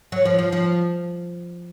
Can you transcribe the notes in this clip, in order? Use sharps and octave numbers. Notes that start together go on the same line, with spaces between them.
F#3
F3
F3
F3